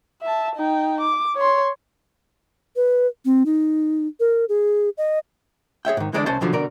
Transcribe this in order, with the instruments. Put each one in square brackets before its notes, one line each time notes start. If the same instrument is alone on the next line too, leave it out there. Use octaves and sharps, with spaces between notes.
[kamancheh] E5 A5
D#4 G5
D6
C#5 C6
[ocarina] B4
C4
D#4
A#4
G#4
D#5
[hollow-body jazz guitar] G#4 C#5 E5 G5
G#2 D#3
D3 E3 G#3 D4 G4 D5
C2 C#4 C5 A5
B2 D3 F3 F#3
B2 D3 A#4 D5